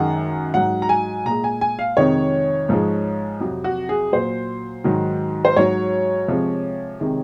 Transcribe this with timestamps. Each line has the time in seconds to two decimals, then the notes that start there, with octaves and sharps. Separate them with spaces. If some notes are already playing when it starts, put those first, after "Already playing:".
Already playing: F#2 D#3 G#3 F#5
0.54 G#2 F#3 F#5
0.82 A#5
0.89 G#5
1.25 A#2 G#3 A#5
1.44 G#5
1.61 G#5
1.79 F5
1.97 F2 C3 D#3 G#3 C#5
2.69 G#2 F3 G#3
3.40 F2 C3 F#3
3.64 F#4
3.89 G#4
4.12 A#2 F#3 C5
4.84 G#2 D#3 F#3
5.45 C5
5.56 G#2 F#3 C#5
6.28 C3 F3 G#3
7.00 C3 D#3 G#3